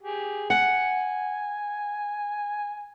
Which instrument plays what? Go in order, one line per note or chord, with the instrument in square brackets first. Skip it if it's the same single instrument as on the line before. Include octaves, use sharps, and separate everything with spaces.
[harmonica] G4 G#4
[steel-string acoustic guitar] F#5 [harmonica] G#5